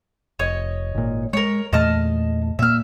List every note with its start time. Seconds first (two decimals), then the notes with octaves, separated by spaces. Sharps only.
0.39 F1 C#5 D#5
0.95 G#1 A#2
1.33 G#3 A#4 C#5
1.73 E2 A#2 A3 D#5 A5 F6
2.59 A#2 A#3 E5 F6